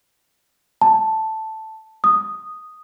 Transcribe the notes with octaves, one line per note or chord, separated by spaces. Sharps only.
A5
D#6